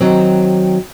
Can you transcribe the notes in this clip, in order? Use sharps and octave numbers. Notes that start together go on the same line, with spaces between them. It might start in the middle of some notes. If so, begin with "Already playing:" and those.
D#3 F#3 C4